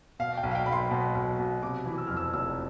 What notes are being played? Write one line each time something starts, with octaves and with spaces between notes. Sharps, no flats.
B2 F5
G5
B1
F5
G5
B1 B5
C6
B2
B1
B2
C3 D6
E3
E6
F2 F6
E6
F1 E6